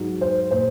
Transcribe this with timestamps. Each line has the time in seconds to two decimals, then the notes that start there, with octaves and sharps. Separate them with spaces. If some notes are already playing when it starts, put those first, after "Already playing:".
Already playing: G#2 F#3
0.21 C5
0.51 A#2 C5